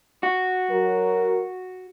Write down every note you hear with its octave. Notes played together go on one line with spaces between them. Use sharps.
F#4
F#3 A#4